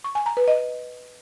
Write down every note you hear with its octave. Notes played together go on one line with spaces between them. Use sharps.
C#6
G#5
A#5
B4
D#5